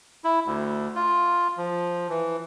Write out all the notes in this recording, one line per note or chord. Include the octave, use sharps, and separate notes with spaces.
E4
D2
F4
F3
E3